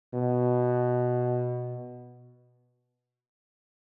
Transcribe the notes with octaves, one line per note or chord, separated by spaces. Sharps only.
B2